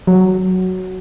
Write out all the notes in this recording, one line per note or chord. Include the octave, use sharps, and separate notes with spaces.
F#3